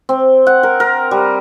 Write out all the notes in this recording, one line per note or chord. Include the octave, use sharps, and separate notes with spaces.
C4
F#5
A#4
A#4
G3